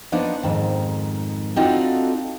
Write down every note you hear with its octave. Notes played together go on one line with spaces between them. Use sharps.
F3 A#3 B3 D4 D#4
F2 G#2 D#3
C4 D4 D#4 F4 F#4 A4